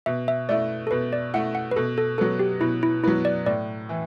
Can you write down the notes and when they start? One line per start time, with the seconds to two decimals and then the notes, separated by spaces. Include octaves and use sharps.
0.06 B2 E5
0.28 E5
0.49 A3 E4 D5
0.87 A4
0.91 B2 B4
1.13 D5
1.34 A3 E4 F#5
1.55 F#5
1.71 B4
1.76 B2 A4
1.98 A4
2.18 F#3 B3 A4
2.39 G4
2.61 B2 E4
2.83 E4
3.04 F#3 B3 E4
3.25 D5
3.46 A2 D5
3.89 E3